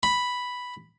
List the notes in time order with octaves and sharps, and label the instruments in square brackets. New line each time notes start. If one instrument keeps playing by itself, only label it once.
[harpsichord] B5